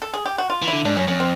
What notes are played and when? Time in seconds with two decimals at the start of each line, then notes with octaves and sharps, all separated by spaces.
0.02 A4
0.14 G#4
0.26 G4
0.38 F#4
0.50 F4
0.62 E3
0.68 D3 E4
0.85 G#2 D4
0.96 F#2 C#4
1.07 F2 C#4
1.20 C4